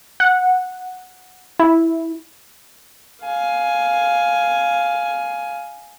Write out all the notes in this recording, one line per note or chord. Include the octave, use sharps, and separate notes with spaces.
F#5
E4
F5 G#5